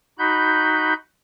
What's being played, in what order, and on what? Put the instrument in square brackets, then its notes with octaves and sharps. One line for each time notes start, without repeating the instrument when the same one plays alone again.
[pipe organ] D#4 F#4 B5 G6